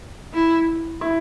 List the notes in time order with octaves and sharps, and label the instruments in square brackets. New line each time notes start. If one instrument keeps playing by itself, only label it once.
[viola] E4
[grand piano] E4